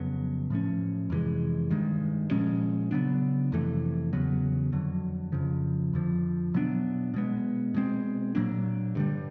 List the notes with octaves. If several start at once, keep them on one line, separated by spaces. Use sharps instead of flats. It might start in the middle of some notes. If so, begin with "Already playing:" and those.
Already playing: F2 C#3 F#3 B3
A2 F3 A3 C#4
F2 C3 E3 G#3
G2 D#3 G#3
A#2 F3 G#3 C#4
C#3 F#3 B3 D4
F2 C3 E3 A3
E2 C#3 F#3 B3
F2 D3 F#3
F2 C#3 F3
F2 D3 F3
B2 F#3 B3 D4
B2 G#3 B3
B2 G#3 C4
A#2 F#3 A#3 D4
G2 D3 G3